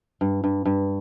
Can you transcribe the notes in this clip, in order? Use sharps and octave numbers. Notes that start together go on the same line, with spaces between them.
G2
G2
G2